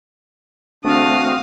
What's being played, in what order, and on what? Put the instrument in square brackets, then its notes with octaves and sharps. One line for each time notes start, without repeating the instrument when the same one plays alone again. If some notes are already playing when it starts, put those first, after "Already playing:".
[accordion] E2 D3 F#4 [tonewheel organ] A3 C4 [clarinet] D4 [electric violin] F5 D#6